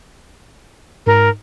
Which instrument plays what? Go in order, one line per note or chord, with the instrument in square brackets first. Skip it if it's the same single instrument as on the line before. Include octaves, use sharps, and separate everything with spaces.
[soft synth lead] G#2 [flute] A#4